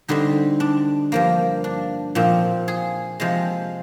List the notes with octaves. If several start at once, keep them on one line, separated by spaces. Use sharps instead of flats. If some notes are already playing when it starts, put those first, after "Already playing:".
D3 G3 C4 D#4
D4
G2 F3 A#3
D4
A#2 F3 C4
G#4
C3 F3 G#3